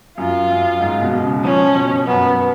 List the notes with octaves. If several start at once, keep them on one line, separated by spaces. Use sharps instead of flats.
F#2 F4
F#2
G#2
B2
C#3
F3 C#4
B2
F#2 B3